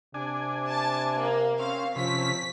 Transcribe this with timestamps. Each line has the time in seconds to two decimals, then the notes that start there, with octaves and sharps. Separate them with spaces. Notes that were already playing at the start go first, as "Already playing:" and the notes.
0.14 C3 D4 G#5
0.67 A5
1.16 A#3
1.59 C4 C#4 F5
1.96 C3 F3 C#4 B6